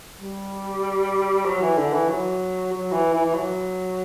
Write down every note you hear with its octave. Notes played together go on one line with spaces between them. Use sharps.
G3
F#3
E3
D3
E3
F#3
F#3
E3
E3
E3
F#3